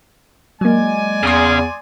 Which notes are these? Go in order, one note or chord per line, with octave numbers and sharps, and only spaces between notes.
F#3 G#3 A#3 D5 G#5
E2 C#3 G#4 C6 D#6